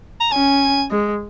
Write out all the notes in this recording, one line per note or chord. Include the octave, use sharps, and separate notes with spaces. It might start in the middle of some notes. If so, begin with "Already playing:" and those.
A#5
C#4 G#5
G#3